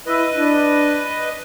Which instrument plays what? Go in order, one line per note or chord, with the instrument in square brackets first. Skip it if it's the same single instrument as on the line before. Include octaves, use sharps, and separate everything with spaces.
[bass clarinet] E4 [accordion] B4 D#5
[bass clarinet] D4